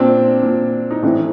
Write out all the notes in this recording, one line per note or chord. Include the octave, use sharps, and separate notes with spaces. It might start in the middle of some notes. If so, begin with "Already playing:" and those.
Already playing: A#2 C4 D4
A#2
D#4
A2 E3 C4 D4